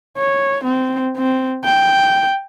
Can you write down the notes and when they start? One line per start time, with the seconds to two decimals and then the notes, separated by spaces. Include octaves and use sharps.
0.18 C#5
0.64 C4
1.17 C4
1.65 G5